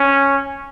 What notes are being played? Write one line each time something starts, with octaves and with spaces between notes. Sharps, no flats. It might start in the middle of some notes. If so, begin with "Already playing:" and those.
Already playing: C#4